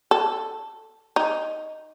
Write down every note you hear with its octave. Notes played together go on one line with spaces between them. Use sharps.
A4
D#4